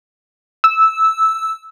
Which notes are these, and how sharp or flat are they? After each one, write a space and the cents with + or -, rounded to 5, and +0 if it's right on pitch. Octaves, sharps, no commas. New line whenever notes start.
E6 -10